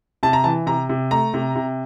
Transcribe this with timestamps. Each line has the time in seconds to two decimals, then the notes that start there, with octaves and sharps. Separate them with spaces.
0.23 C3 A5
0.33 A#5
0.44 E3 A5
0.67 C3 A#5
0.89 C3
1.11 A3 A#5
1.34 C3
1.56 C3